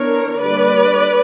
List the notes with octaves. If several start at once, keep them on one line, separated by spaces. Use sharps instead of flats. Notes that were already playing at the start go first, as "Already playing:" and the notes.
Already playing: E3 B3 D4 A#4 C#5
D3 G3 A#3 D4 B4 D5